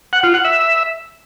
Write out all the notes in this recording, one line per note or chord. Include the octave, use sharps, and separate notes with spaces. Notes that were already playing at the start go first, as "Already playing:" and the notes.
F#5
F4
F#5
E5